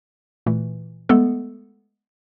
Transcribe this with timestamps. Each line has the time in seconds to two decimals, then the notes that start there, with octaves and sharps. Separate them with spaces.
0.46 A#2 E3 A3
1.09 G#3 A3 B3 A4